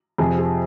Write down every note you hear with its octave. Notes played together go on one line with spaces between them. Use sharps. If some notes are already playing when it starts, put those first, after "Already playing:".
F2 C3 F3 G#4
G#4